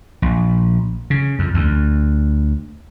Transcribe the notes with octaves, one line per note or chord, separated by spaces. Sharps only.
A#1
C#3
F2
D2